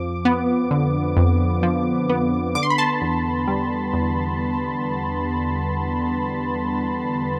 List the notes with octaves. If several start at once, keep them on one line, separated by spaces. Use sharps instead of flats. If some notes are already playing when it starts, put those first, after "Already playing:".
Already playing: F2 F3 D6
B3
D3
F2
F3
B3
D3 D6
C6
B5
A5 C6
E2
G3
E2